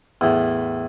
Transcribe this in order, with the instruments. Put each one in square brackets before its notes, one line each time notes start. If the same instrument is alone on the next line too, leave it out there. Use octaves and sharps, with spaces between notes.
[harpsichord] E2 A2